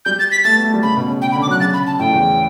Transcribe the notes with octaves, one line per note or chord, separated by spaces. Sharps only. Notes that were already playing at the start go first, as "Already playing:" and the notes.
G3 G6
A6
B6
A3 A6
B3
A3
G3
C#3 B5
B2
C#3
G5
B5
D3
D6
F#3 F#6
C#3 A6
B5
A5
A2 G5
E2